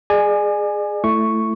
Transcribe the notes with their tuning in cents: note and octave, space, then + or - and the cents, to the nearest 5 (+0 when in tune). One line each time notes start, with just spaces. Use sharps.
G#4 +0 D5 +40 G#5 +0
A3 +0 E4 +15 C#6 +0